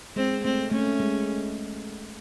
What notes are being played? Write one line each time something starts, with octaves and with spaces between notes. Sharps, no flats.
G#3 C4
A3 C4
A3 C#4
G#3